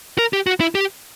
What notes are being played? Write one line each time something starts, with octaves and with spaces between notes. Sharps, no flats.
A#4
G4
F#4
E4
G4